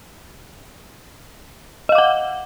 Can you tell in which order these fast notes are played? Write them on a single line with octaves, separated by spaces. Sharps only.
D#5 F5 D6 F#5